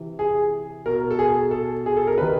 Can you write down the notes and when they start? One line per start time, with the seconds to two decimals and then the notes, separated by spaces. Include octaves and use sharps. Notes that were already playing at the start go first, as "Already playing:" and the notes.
Already playing: C3 E3
0.19 G#4
0.86 B2 A#4
1.11 A4
1.19 G#4
1.51 A4
1.86 G#4
1.97 A4
2.07 A#4
2.18 C3 D#3 B4